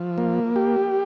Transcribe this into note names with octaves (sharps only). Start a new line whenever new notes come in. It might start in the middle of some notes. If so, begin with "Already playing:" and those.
Already playing: F3
A#3
G4